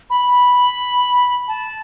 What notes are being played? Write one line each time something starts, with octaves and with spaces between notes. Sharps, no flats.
B5
A5